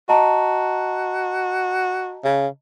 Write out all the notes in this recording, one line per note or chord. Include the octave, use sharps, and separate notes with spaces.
F#4 D#5 A5 A#5
C#3